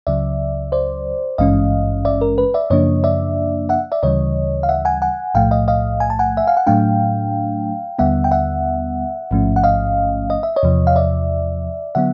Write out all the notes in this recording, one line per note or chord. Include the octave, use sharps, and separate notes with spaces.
C#2 C#3 F#3 D5 E5
C5 D5
G#1 G2 E3 G#3 C#4 D#5 F5
D5 E5
A#4
B4
D5 E5
F#2 C#3 F3 A#3 D4 C#5 D#5
D5 E5
E5 F#5
D5 E5
D2 C#3 E3 G3 C#5 D#5
F5
E5 F#5
F#5 G#5
F#5 G#5
B1 A2 F3 A3 F5 G5
D#5 F5
D#5 F5
G#5
A5
F#5 G#5
E5
F5
F#5
A2 F#3 A3 D4 F5 G5
D#2 D3 G3 B3 E5 F#5
G5
E5 F#5
A1 G#2 F3 A3 C#4
F#5
D#5 F5
D#5
E5
C#5 D#5
E2 C3 F3
F5
D5 E5
D3 F#3 B3 E5 F#5